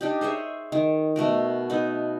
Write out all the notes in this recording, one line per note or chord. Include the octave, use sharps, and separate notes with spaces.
D4 D#4 G4
G#4 C5 C#5 E5
D#3
B2 A3 F#4 A#4
B3 D#4